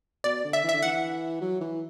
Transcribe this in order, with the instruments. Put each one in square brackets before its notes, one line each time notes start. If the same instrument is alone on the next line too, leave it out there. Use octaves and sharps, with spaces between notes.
[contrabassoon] B2 [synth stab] D5
[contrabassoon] D3
[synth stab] E5
[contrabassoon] E3
[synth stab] E5
[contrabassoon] D3
[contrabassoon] E3 [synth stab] F#5
[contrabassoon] F#3
E3